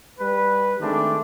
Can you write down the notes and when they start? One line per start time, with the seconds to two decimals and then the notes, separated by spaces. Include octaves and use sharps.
0.19 G3 B4
0.80 D#3 G#3 A3 C4 D4